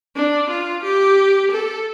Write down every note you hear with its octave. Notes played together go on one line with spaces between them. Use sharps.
D4
F4
G4
A4